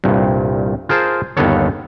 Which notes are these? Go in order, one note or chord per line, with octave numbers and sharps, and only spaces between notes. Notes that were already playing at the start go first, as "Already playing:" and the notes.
C2 G2 A#2
F4 G#4 A#4 C5 A5
G1 D#2 A#3 B3 A4 C#5